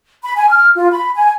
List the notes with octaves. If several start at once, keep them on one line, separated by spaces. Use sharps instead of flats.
B5
G#5
F6
F4
B5
G#5